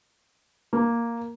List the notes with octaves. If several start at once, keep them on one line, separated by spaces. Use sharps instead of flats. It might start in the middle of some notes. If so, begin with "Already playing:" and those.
A#3